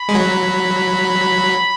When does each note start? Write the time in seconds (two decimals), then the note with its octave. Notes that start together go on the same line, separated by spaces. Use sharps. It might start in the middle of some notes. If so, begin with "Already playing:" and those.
Already playing: B5
0.09 G#3
0.15 F#3